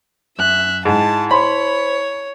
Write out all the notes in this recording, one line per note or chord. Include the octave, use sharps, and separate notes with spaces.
F#2 E5 F#6
G#2 E4 A5
C5 C#5 B5